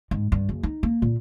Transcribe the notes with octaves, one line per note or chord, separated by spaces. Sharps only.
G#2
G2
F#1
D#4
A#3
A#2